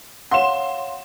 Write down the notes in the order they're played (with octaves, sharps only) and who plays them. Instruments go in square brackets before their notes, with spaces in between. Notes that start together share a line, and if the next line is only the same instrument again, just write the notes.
[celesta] C#5 F5 F#5 [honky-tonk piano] C6 E7